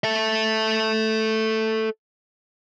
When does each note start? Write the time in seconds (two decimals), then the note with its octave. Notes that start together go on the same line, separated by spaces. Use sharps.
0.04 A4 E5